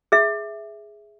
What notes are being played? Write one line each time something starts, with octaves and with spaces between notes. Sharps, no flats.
G#4 E5